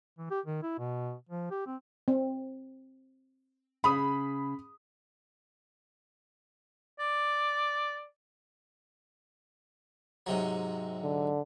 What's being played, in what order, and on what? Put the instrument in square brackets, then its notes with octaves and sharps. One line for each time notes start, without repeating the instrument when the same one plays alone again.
[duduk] E3
G4
D#3
E4
B2
F3
G4
C4
[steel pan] C4
[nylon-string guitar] C#3 [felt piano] B5 D#6
[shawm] D5
[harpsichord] G#2 C3 F#3
[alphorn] D3